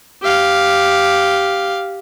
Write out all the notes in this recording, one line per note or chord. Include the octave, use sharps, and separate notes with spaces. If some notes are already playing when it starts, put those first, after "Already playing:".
G4 F5